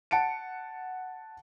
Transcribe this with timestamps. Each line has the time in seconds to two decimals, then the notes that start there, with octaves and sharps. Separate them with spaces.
0.11 F#5 A5 C#7 D7